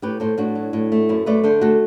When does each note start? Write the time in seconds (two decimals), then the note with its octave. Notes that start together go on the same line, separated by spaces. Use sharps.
0.02 A2 G4 B4
0.20 A2 A4 C5
0.38 A2 D4 F#4
0.55 F#3
0.73 A2
0.92 A3
1.09 F#2 C4 E4
1.26 A3 B4 D5
1.44 D3 A4 C5
1.61 A3 F#4 A4